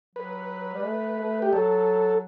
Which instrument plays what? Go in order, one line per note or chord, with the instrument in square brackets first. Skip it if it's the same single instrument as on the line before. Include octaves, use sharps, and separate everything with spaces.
[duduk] F#3 [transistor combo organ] B4
[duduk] G3
A3
A3
[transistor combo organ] G4
[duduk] F#3 [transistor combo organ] A4